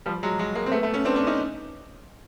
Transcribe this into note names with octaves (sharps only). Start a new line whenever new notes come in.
F3 G3
F#3 G#3
F#3 G#3
G#3 A#3
C4
A3 B3
A3 B3
B3 C#4
C4 D4
C4 D4
C#4 D#4